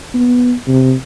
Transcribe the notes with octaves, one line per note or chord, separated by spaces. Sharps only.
B3
C3